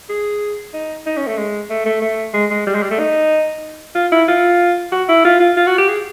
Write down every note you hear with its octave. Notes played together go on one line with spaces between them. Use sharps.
G#4
D#4
D#4
C#4
A3
G#3
A3
A3
A3
G#3
G#3
G3
G#3
G3
A3
D#4
F4
E4
F4
F#4
E4
F4
F4
F4
F#4
G4
G#4